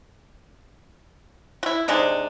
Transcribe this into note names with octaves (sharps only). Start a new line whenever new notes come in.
E4 F#4
C3 G#3 D4 D#4